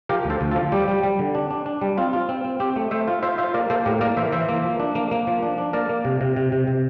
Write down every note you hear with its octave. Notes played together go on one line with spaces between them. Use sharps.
F3 G4 A#4
D2
A4 C5
D2
F4 A4
F3
G3 G4
G3
G3
D3
D4
D4
D4
G3
C4 F4
F4
C4
C4
C4 G4
A3
A3 C5 E5
F4
F4 C5 E5
F4 C5 E5
A#3 A#4 D5
A#3 A4 C5
A2 G4 A#4
A#3 A#4 D5
E3 C5 E5
E3 C5 E5
A#3
F3
D4
A#3
A#3
F3
D4
D4
A#3 A#4 D5
A#3
C3
C3
C3
C3
C3